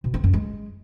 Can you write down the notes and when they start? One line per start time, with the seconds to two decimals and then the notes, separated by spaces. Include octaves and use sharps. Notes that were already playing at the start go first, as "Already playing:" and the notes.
0.04 B2
0.14 C4
0.24 F#2
0.33 G#3